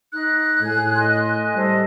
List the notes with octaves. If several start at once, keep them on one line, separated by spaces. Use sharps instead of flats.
D#4 F#6
A2 G#4 G#6
D#5 G#5 C6
G3 A4 C5 D#5